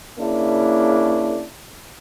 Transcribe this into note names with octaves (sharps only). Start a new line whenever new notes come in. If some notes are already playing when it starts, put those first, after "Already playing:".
C#3 A#3 D4 E4